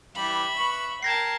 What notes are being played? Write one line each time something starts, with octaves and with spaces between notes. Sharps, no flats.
E3 G3 E5 B5
B4 C#6 F#7
A#4 G5 A5 G#6 A#6 C7